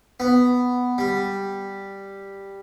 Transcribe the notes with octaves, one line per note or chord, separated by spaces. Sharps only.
B3
G3